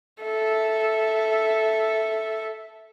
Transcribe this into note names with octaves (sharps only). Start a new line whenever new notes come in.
A4 E5